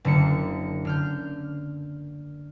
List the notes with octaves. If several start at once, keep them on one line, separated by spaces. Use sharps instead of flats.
F#1 D3 A#3 C#7
D3 F6 G6